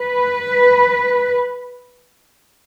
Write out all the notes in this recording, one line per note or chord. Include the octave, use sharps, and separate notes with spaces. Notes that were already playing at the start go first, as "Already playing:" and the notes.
Already playing: B4